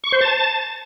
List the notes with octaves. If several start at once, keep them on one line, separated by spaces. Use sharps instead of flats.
C#6
C5
A5